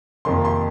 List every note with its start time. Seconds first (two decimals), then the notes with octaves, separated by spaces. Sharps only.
0.25 F2 C3 D#3 A#3 C6
0.45 C6